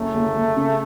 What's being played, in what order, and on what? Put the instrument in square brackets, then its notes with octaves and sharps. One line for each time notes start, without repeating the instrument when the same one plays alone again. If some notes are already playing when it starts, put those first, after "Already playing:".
Already playing: [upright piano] F#1 F#2 [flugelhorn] A3
[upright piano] F#1
F#1
C#3